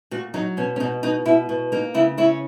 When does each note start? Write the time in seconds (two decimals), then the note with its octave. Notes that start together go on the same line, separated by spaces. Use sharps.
0.11 A#2 F#4
0.34 F#3 D#4
0.57 B2 C#4
0.76 C#4
0.80 B2 D#4
1.03 B2 D#4
1.25 B2 E4
1.49 B2
1.72 A#3 D#4
1.94 C#3 E4
2.17 C#4 E4